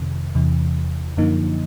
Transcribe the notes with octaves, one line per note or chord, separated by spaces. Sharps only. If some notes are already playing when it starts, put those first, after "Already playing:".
Already playing: F2 C3 D#3
E2 C3 E3
F#2 D3 F3 A#3 D#4